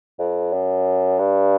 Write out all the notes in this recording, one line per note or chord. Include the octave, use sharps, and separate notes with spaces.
F2
F#2
G2